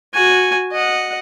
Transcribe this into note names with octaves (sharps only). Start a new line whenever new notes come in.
F#4 G#5
D#5 F#5